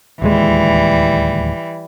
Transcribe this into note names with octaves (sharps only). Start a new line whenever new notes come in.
D1 D#2 E3 G3 G#3